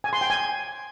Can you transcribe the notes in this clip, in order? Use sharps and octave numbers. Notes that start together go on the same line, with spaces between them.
G#5
C6
G5
G#5